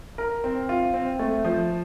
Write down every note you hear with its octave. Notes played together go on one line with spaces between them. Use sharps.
A#4
C4
F4
C4
A3
F3